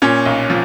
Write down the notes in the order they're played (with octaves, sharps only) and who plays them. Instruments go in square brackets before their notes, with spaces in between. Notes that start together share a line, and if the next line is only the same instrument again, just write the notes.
[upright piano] A#2 C#4 C#5
B1
F3